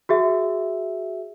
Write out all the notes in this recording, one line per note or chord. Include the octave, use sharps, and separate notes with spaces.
F#4 G#4 E5